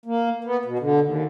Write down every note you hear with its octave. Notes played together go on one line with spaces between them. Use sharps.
A#3
B3
B2
D3
D#2